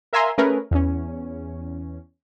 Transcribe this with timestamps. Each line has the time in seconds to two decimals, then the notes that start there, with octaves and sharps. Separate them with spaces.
0.13 A#4 E5 F5 G#5 A#5 C6
0.38 A3 C#4 G#4 A#4 B4
0.71 E2 C#4